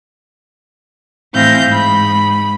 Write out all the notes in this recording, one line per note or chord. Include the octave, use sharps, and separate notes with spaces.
A2 E3 C4 F5 G6 A#6
G#2 B5